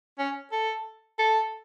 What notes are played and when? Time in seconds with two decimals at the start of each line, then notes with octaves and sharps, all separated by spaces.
0.19 C#4
0.52 A4
1.19 A4